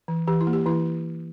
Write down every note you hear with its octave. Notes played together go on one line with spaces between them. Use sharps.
E3
E3 G4
E4
A#3
G4
E3 E4